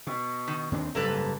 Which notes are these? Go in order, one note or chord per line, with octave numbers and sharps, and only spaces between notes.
B2
D#3
D#2 C4 D4
F#1 G#2 G3 A#3 A4 B4